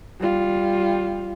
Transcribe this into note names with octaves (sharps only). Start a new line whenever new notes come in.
G3 F4